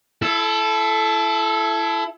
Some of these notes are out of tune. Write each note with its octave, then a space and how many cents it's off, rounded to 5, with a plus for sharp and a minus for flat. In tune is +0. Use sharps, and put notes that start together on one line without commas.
E4 +25 A4 -15